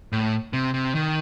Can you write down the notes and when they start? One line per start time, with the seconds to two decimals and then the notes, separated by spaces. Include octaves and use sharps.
0.12 A2
0.53 C3
0.74 C3
0.95 D#3